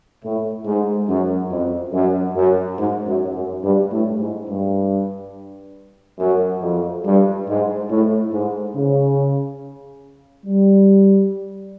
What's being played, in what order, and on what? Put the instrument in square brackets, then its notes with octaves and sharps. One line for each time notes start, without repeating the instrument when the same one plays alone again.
[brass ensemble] A2
G#2
F#2
F2
F#2
F#2
G#2
F#2
F#2
G2
A2
G#2
G2
F#2
F2
G2
G#2
A2
G#2
C#3
G3